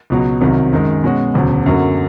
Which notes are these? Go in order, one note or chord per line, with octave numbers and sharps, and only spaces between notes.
C#2 B2 F#3
C2 C3 D#3 F#3
F#2 D#3 G#3
B2 G#3 C#4 F#4
E1 D2 C#3 F#3
F#2 D3 F#3 A#3